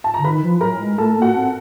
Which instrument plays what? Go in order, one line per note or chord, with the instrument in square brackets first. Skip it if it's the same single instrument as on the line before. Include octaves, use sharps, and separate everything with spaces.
[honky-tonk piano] A5
[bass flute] D3 [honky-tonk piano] A#5
[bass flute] D#3 [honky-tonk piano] B4 B5
[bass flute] F3
[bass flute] F#3 [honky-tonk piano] A#4 A#5
[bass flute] G#3
[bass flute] A3 [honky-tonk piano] A4 A5
[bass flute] A#3
[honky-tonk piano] F#4 F#5
[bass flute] C4